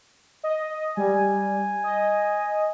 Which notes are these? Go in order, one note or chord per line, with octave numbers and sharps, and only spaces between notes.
D#5
G3 G#5
D#5